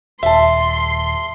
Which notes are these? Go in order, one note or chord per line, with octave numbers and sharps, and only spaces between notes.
D#1 E5 A5 C6